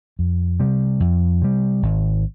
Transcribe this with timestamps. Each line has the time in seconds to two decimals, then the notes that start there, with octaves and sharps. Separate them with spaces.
0.19 F2
0.60 C3 G3
1.00 F2
1.42 C3 G3
1.82 G#1